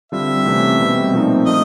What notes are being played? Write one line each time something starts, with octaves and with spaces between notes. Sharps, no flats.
D3 G3 C4 F4 E5
C3 E3 A3 C#4
B2 G3 C4
A#2 F3 A3 C4 D#4
A3 D4 F4 D#5